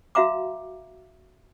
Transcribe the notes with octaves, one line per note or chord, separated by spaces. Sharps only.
F#4 E5 F5 A#5 D6